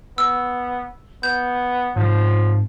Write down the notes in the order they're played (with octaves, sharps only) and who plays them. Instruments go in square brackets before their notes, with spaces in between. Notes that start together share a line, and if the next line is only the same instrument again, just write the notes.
[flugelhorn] B3 [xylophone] E6
[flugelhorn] B3 [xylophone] G6
[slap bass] G#2 C3 [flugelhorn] F3